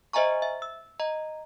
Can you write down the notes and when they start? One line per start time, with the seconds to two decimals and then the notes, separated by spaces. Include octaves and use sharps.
0.13 C5 D#5 E5 G#5 A#5 C#6
0.42 E5
0.62 E6
1.00 D#5 A#5